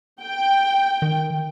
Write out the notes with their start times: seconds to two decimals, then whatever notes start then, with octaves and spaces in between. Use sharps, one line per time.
0.23 G5
1.02 D#3